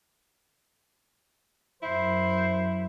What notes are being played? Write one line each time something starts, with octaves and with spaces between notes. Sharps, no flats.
F#2 E4 C5